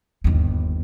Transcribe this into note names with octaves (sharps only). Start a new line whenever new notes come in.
G1 D#2